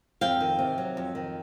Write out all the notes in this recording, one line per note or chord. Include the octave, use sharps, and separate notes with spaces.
F2 F5 G5
D#3
C3
F#3
F2
D#3